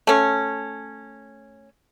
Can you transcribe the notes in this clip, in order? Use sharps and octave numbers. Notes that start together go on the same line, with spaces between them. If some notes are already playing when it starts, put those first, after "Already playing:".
A3 C#4